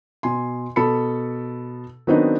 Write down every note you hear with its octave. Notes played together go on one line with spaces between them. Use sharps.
B2 G#5 C6
B2 A4 A5 B5 C#7
D#3 F#3 B3 C4 D4 D#4